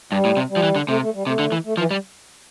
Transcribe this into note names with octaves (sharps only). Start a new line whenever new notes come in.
G2 G3
A2
C3
G3
F3
E3
D3
C3 A3
A3
G3
C3 A3
D3
E3
A3
E3 F3
G3